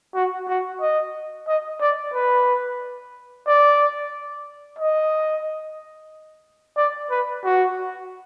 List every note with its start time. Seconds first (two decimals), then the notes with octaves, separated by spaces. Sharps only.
0.15 F#4
0.49 F#4
0.81 D#5
1.48 D#5
1.81 D5
2.14 B4
3.47 D5
4.79 D#5
6.77 D5
7.10 B4
7.44 F#4